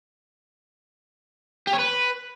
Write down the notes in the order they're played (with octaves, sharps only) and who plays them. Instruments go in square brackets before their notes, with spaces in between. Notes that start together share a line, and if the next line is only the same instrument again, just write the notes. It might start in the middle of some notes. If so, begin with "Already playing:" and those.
[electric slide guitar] G4
C#5
B4